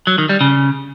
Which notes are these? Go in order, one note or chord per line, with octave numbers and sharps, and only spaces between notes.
F#3
D#3
G3
C#3